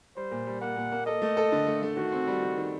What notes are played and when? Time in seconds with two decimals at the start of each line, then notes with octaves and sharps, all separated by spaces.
0.17 G3 C5
0.31 A#2
0.46 G3
0.61 A#3 F#5
0.76 A#2
0.92 A#3
1.06 A4 D#5
1.22 A3
1.37 A4
1.52 D3
1.67 A3
1.82 A3
1.97 D#3 F#4
2.12 C4
2.27 G3
2.43 D#3
2.58 D#3